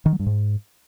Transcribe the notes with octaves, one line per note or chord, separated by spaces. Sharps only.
D#3
F#3
G2
G#2